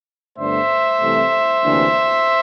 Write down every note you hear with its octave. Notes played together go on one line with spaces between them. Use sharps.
G1 G2 D3 A3 D4 C5 E5
C2 C3 E3 A3
D2 C3 E3 A#3 D4